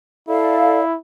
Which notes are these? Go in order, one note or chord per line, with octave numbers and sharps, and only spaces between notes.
E4 A4 D5 F5